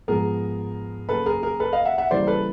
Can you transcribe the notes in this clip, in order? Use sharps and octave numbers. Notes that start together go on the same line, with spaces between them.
G#2 F3 G#3 B3 G#4 A#4
C#3 F#3 A#3 A4 B4
G#4 A#4
G#4 A#4
A4 B4
D#5 F5
E5 F#5
E5 F#5
C#3 E3 G3 A#3 C5 D5
A4 B4